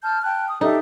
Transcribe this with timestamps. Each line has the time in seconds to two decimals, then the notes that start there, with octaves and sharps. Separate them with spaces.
0.02 A5 F6 G6
0.23 G5 A5 F#6
0.48 D#6
0.61 D#4 G4 A4 E5